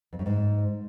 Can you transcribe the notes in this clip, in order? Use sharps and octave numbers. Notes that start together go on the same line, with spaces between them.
F2
F#2
G#2